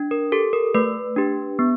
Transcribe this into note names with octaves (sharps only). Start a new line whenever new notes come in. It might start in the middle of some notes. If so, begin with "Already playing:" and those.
Already playing: D4
A#4
G4 A4
A#4
A3 B4
D4 G4
B3